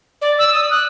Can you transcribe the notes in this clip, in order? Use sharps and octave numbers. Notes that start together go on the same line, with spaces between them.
D5
E6
D#6
F#6